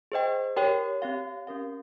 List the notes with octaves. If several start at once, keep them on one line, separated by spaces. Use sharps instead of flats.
G#4 C5 D#5 G5
G4 A#4 C#5 G5
C4 G4 C#5 F5
C#4 G4 A#4 F5